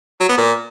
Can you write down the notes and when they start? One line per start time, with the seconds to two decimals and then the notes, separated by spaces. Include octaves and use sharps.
0.21 F#3
0.29 B3
0.38 A#2